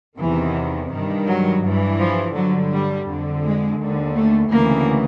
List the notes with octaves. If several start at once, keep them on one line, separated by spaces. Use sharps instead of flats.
E2 C3 D#3 E3
G2 D#3
F#3
G2 E3
F3
G2 D3 F#3
G3
F2 D3
G#3
D#2 D3
A3
D2 C#3 E3 A#3